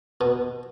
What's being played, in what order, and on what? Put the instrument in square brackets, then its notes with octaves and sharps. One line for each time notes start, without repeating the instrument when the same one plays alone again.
[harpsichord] B2